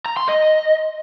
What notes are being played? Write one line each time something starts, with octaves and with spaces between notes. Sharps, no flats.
A#5
C6
D#5